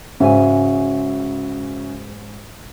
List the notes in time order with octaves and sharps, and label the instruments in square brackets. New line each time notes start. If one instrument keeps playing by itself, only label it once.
[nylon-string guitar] G#2 G#5 [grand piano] C#3 F#4 E5